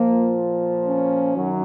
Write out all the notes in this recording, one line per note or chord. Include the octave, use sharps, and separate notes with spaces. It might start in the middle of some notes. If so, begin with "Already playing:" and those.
Already playing: A#2 F3 A#3
C#4
F#2 D#3 F#3